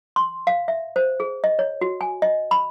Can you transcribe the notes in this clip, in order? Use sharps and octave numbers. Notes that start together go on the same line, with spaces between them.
C6
F5
E5
C5
G#4
D#5
C#5
F#4
G#5
D#5
B5